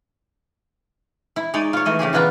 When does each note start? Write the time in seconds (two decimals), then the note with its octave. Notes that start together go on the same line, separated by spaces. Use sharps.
1.36 E4
1.54 G#3 D#4 C#5 D5
1.73 F4 C#5
1.86 E3 A3 D#5
1.99 C#3 F3 G4 G#4
2.13 E3 A#3 B3 D4 F4